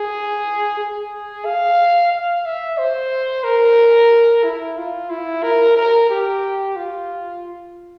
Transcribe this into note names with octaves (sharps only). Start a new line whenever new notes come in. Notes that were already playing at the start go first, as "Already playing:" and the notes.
Already playing: G#4
G#4
F5
F5
E5
C5
A#4
E4
F4
E4
A#4
A#4
G4
F4